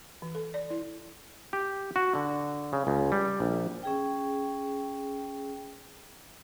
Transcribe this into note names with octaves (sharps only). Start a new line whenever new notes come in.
E3
A4
D5
E4
G4
F#4
D3
C#3
C#2
G3
A#1
C#4 G#4 G5